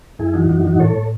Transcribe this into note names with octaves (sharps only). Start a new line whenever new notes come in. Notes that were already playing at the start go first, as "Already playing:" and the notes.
F#2 E4 G#4
E3 D#4 F#4
F#2 D#4 F#4
E3 D#4 F#4
A2 A4 C#5
A2